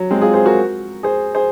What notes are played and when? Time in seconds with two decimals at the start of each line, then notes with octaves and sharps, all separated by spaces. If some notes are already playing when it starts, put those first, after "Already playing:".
Already playing: F#3
0.11 G#3 C4
0.22 F4 G#4
0.34 G#4 C5
0.45 F#4 A#4
1.03 G#4 C5
1.35 G#4 C5